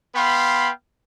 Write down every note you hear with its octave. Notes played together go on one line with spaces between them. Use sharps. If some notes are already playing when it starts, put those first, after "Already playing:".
B3 B4 F5 G5 B5 C6